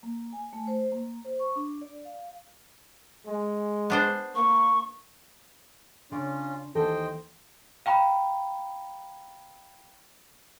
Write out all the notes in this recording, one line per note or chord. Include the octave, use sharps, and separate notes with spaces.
A#3
G#5
A3
C5
A#3
C5
C#6
D4
D5
F5
G#3
B3 D4 C5
A#3 C#6
C#3 C#4 D4 F4 D5 C6
D#2 E3 A4 C5 D#5 G5
F5 G5 A#5 B5